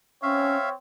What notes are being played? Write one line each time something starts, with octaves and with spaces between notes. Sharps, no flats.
C4 C#4 C#5 E5 F5